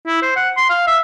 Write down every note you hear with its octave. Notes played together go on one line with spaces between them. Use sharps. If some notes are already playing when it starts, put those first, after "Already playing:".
E4
C5
F#5
C6
F5
E5